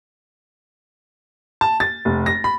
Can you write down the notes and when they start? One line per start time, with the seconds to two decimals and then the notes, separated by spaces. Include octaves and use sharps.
1.61 A5
1.80 A6
2.05 F1
2.26 A#6
2.44 B5